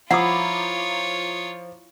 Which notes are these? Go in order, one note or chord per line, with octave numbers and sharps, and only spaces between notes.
F3 E4 F4 C#5 F#5 A#5 D6 D#6